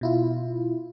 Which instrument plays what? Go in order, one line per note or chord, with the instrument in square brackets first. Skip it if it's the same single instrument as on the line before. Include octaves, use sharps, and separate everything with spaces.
[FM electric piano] B2 E4 F4